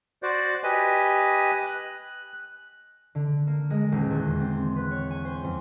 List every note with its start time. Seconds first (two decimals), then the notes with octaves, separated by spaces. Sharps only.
0.23 F#4 C5 D5
0.64 G4 B4 D#5 G#5
1.66 F#6
3.15 D3
3.47 A#3
3.70 G#3
3.92 D#1
4.10 E2
4.40 C4
4.76 B4
4.91 C#5
5.11 G#5
5.25 C5
5.43 F2